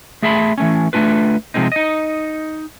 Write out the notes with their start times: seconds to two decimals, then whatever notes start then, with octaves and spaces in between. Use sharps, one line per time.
0.22 A3 G#4 E5 A5 B5 C6
0.58 E3 A3 C#4
0.93 A3 C#4 D4 F4 B4
1.54 C3 F3 G#3 C4 D#4
1.72 D#4 D#5